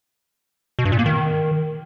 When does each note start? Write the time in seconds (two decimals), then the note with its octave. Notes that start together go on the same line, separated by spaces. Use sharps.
0.79 B2
0.85 G2
0.92 A#2
0.99 A#3
1.06 D#3